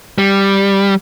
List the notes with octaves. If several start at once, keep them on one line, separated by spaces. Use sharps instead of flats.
G3